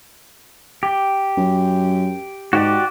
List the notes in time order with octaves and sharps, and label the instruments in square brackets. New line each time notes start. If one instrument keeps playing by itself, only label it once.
[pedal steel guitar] G4
[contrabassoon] F#2
[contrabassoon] G#2 [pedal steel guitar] F#4 G4 D5